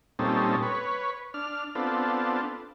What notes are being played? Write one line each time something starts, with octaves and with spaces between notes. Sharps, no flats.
A#2 G3 C4 C#4 D#4 A4
B4 C#5
D4 F6
B3 C4 D4 F4 A4